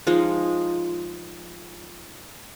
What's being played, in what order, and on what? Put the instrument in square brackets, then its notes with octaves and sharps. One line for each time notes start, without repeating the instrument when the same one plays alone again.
[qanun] F3 G#3 D#4 G#4